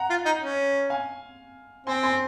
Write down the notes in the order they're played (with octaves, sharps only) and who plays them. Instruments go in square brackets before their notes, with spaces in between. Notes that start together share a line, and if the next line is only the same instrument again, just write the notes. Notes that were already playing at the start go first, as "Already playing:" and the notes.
Already playing: [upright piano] F#5 A#5
[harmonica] F4
D#4
C#4
[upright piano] F5 G#5
[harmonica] C4 [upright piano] G#5 C6
[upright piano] G#5 C6